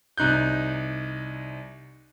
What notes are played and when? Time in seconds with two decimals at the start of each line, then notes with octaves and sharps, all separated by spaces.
0.17 C2 D#4 F#6 G6